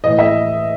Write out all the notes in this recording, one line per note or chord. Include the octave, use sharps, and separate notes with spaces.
A2 E3 D#5
E5